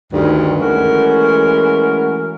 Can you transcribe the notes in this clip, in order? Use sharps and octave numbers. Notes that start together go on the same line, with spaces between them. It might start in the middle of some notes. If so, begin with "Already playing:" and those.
D2 G2 D#3
E3 G#3 A3 C#4 F#4 A#4